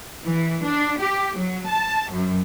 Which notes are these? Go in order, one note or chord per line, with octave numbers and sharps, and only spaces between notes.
E3
D4
G4
F#3
A5
F#2